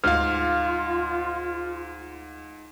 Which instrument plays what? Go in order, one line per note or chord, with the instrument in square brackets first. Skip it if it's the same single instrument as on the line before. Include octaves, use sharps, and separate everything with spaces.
[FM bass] D2 [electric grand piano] G#2 F5 [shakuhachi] F4 [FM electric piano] F6